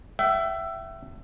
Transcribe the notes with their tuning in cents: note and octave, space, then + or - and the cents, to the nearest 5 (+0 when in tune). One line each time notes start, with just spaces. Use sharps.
E5 +20 G5 -45